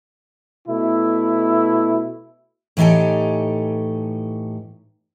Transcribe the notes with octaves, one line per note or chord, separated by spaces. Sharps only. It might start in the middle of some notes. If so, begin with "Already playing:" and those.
B2 A3 E4
A2 E3 D#4 G4 A4 G#5